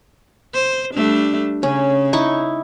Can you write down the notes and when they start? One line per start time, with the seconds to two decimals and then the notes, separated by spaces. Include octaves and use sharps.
0.53 C5
0.94 G3 A3 D4
1.63 C#3 C#4
2.13 D#4 E4 C#6